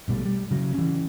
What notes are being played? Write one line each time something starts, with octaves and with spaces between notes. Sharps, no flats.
A#1 B2 G3 A3
G3
C#3 F#3
E3 C#4